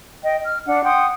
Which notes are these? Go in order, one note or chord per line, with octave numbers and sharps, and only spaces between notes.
D#5 G5
F6
D4 F#5
F#5 G5 C6 D#6